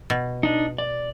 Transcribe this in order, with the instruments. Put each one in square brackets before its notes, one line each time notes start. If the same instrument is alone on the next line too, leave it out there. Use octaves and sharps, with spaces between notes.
[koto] B2
[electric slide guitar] D4 D#4
D5